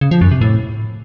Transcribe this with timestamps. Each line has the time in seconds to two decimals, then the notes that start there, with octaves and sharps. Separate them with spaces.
0.01 C#3
0.11 F3
0.21 F#2
0.31 C3
0.41 A2